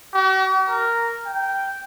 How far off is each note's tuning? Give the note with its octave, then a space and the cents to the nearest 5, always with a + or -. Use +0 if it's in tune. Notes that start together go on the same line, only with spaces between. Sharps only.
F#4 +45
A#4 -5
G5 -10